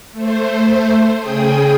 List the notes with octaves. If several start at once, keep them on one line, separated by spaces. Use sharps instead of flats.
A3 C5
C#3 G#4 G5 D#6